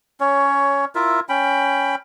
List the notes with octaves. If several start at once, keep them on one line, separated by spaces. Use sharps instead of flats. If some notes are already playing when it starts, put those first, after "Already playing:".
C#4 C#5
E4 F4 A#4 E5
C#4 G5 B5